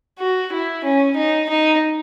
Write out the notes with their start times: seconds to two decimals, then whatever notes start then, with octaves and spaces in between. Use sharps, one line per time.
0.19 F#4
0.52 E4
0.84 C#4
1.16 D#4
1.49 D#4